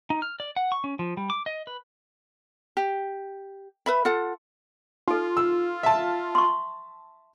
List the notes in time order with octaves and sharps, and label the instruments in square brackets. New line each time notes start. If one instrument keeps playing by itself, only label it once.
[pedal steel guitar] D#4
F6
D5
F#5
C#6
C#4
F3
G3
D6
D#5
B4
[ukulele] G4
B4 E5 B5
F4 A4 F#5
[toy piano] D#4 A4 [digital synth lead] F4
[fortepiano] E6
E5 A5
[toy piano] C6 C#6